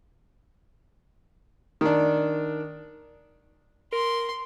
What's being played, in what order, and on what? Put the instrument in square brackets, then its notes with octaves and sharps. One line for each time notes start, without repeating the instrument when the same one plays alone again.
[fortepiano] D#3 D4
[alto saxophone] A#4 [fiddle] C6